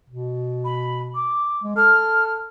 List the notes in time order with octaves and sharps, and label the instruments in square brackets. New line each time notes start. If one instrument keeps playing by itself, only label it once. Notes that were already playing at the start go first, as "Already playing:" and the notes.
[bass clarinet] B2
[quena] B5
D6
[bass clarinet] G#3
[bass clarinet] A4 [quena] F6